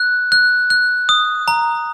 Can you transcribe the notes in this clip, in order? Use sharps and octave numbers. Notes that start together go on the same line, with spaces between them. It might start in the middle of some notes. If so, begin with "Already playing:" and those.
Already playing: F#6
F#6
F#6
D#6
A#5